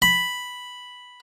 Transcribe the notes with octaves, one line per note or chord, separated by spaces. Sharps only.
B5